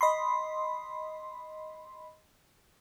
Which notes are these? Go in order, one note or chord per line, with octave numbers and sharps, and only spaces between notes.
D#5 B5 C6